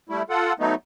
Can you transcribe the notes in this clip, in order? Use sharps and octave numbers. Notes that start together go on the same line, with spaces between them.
G3 A3 E4
F4 A4 F#5
F#3 A3 B3 D#4